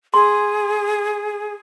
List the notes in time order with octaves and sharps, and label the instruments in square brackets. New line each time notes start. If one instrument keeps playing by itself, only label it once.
[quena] G#4 [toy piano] C6